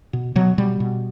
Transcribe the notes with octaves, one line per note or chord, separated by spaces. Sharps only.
B2
B2 F#3
B2 G3
B2